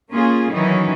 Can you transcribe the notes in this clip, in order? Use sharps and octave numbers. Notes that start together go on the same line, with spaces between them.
A#3 C#4 F4 G#4
D#3 E3 F#3 C#4 D#4